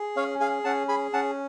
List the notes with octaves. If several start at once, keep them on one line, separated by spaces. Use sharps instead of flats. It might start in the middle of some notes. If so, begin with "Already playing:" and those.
Already playing: G#4
C#4 C#5 F5
G#4 F5 G#5
C#4 F#5 A5
G#4 G#5 B5
C#4 F#5 A5